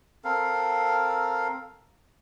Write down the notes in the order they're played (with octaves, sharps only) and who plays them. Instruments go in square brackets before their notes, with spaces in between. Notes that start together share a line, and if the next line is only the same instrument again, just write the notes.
[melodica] C4 A4 A#4 F5